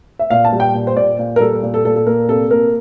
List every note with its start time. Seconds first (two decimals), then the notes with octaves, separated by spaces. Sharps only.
0.19 E5
0.30 A#2 F5
0.45 A5
0.53 G3
0.60 G5
0.74 A#2
0.87 C5
0.96 A#2 D5
1.19 A#2
1.36 A#4
1.40 G3 A4
1.63 A#2
1.74 A4
1.85 A#2 A4
1.96 A4
2.06 A#3 A#4
2.28 C3 A4
2.50 A#3 A#4